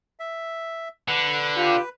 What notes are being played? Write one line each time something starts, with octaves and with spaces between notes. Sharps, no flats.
E5
D3 B4
F4 G4